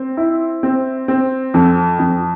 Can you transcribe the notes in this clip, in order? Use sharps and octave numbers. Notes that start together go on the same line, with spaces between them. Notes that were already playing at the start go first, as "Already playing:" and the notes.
Already playing: C4
E4
C4
C4
F2
F2